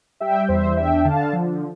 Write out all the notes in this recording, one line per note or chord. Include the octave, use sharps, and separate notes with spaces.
G3 E5 G5
E2 C5 E5
D4 E5 G5
D3 F5 A5
F3